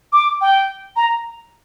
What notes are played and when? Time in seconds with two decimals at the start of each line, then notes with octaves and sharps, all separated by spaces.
0.13 D6
0.41 G5
0.96 A#5